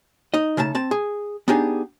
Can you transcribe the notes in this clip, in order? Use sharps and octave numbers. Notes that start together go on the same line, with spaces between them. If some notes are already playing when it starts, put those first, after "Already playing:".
D#4 D#5
C#3 A3 D#4 A5
C4 A5
G#4
B3 D4 D#4 G4 G#4